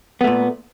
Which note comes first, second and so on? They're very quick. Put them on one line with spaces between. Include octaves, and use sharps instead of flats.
B3 A3 A#2